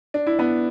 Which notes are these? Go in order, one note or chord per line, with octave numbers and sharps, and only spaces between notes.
D4
E4
B3 D4